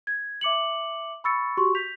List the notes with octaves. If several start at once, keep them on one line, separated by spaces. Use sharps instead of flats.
G#6
E5 D6 C#7 F#7
B5 C#6 E6 A6 C#7
F#4 G4 C6 C#6
G6 B6 F7